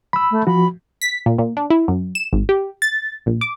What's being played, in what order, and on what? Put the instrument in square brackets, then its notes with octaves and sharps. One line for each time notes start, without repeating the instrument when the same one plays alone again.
[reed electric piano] B5 E6
[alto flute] A3
[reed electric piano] F3 F#4 [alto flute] B5
[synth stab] B6
A#2
A#2
D4
E4
F#2
E7
G#1
G4
A6
A#1
D6